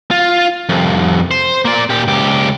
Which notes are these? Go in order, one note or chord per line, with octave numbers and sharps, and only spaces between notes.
F4
C2 F2
C5
A#3 D5
A#2 G4
C#2 G4